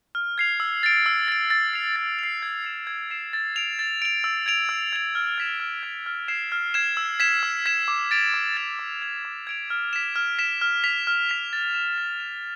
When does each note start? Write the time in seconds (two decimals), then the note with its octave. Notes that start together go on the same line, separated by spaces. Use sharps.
0.15 F6
0.38 G#6 C7 F7
0.60 E6
0.83 A6 D7
1.06 E6
1.28 A6 D7
1.50 A6
1.73 C7 F7
1.96 A6
2.19 C7 F7
2.42 G#6
2.65 C7 E7
2.87 G#6
3.10 C7 E7
3.33 A6
3.56 D7 F7
3.79 A6
4.02 D7 F7
4.24 E6
4.46 G#6 D7 F7
4.69 E6
4.93 G#6 D7 F7
5.15 F6
5.38 G#6 B6 E7
5.60 F6
5.83 G#6 B6 E7
6.06 F6
6.28 G#6 C7 E7
6.52 F6
6.74 G#6 C7 E7
6.97 E6
7.20 G#6 B6 E7
7.43 E6
7.66 G#6 B6 E7
7.88 D6
8.11 A6 D7 F7
8.34 D6
8.57 A6 D7 F7
8.79 D6
9.02 G#6 D7 F7
9.25 D6
9.47 G#6 D7 F7
9.70 F6
9.93 B6 E7
10.16 F6
10.39 B6 E7
10.61 F6
10.84 B6 F7
11.07 F6
11.29 B6 F7
11.53 A6
11.74 E7
11.98 A6
12.20 E7